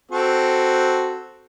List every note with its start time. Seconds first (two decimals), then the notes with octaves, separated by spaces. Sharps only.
0.12 C4 F#4 A4